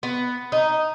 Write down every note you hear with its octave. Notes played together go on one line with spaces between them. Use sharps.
B3
D#4